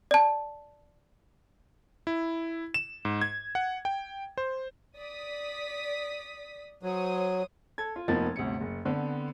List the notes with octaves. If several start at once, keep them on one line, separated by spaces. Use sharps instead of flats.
D5 A5
E4
E7
G#2
G#6
F#5
G5
C5
D5 D#6 B6
F#3 C5 C#5 D#6
A4 G#6
F4
F1 F3 A#3 B3 D#4 A6
G1 D2 C3 C#7
F#1
D3 B3 C4